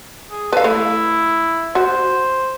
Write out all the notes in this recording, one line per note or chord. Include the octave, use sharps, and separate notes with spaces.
G#4
A4 B4 F5
A3 E4
F#4 C5